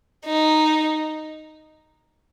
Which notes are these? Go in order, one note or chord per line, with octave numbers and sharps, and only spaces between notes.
D#4